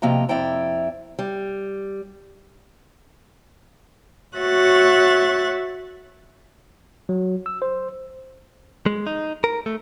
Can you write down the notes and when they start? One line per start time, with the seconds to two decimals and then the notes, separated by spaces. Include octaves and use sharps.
0.02 C3 F3 A#3 D#5 G5 A#5
0.29 F2 E4 D5 G5 A#5
1.19 G3
4.36 F#4 C#5 E5 F#6 A6
7.09 F#3
7.46 E6
7.62 C5
8.86 G#3
9.07 D#4
9.44 A#4
9.66 A3